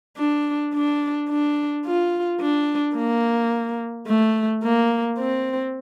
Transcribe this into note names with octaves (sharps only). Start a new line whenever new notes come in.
D4
D4
D4
F4
D4
A#3
A3
A#3
C4